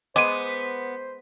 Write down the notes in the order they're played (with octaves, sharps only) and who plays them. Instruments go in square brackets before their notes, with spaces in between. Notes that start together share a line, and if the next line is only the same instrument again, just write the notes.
[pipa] G#3 [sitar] B3 [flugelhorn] C5 [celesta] D6 D#7